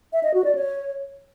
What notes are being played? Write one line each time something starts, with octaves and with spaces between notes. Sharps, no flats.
E5
D#5
F#4
D5
C#5